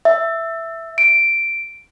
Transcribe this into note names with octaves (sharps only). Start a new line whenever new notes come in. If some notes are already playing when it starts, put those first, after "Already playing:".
E5
D7